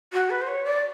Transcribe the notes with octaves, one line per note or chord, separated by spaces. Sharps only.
F#4
B4
C5
C#5
D5